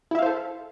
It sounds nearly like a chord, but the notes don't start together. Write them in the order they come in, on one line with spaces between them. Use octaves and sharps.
E4 E5 F5 C5 A4